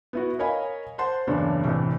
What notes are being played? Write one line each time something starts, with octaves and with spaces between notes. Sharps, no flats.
B3 E4 F#4
A#4 C#5 D#5 F5 G#5 B5
C5 F#5 A5 C6
F#1 E2 G2 D4 C#5
C2 A2 E3